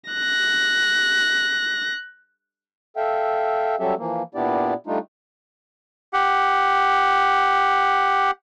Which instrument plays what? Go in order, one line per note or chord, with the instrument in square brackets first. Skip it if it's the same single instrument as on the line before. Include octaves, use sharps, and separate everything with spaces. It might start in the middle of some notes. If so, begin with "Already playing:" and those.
[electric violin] F#6 A#6
[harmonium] A4 E5 F5 G5
F#3 G3 C#4 G4 A4 E5
E3 F3 A#3
A#2 B3 D4 E4 G4 D5
G3 A3 D4 D#4 F4
[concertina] G4 F#5